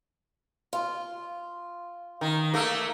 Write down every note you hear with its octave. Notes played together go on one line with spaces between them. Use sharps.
F4
D#3
A3 A#3